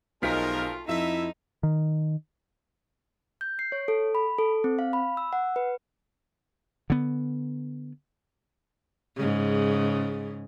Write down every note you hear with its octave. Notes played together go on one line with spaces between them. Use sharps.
B1 F3 G#3 A3 D#4 F4 A#4 B6
F2 F3 D#4 E4 E5
D#3
G6
C7
C#5
A4
B5
A4
C4
F5
B5
E6
F#5
B4
D3 B3
G#2 C#3